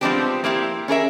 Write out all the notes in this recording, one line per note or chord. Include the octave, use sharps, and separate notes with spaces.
F3 G#3 B3 C4 D4 G4
A#3 C4 E4 G4
C#4 G#4 A#4 E5